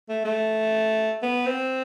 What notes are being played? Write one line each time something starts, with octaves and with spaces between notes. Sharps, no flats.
A3
A3
B3
C4